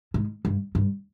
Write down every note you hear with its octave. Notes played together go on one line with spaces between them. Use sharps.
G#2
G2
G2